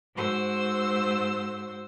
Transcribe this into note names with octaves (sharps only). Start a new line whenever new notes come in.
G#2 F#4 C5 E6